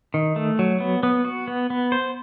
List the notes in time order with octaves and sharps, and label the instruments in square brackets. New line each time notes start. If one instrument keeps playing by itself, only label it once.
[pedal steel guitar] D#3
A3
F#3
B3
B3
F#4
B3
B3
C5